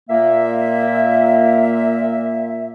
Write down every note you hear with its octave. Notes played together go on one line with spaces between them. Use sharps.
A#2 A#3 E5